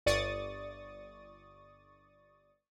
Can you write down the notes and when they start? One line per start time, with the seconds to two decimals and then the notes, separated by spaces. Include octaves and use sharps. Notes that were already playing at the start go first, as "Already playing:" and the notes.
0.06 G1 D5 C#6 D#6 A6